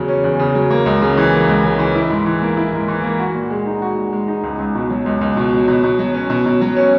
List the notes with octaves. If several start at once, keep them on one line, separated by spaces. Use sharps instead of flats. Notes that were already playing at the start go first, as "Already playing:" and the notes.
Already playing: E2 C#3 F#3
C#4
E2
C#3
F#3
A#3
C#2
C#3
E3
A#3
C#2
C#3
E3
E4
G#2
E3
A#3
E4
G#2
E3
A#3
F#4
A#2
G#3
D#4
F#4
A#2
G#3
D#4
C#2
C#2
B2
F#3
C#2
C#2
B2
F#3
B2
B2
F#3
C#4
B2
B2
F#3
C#4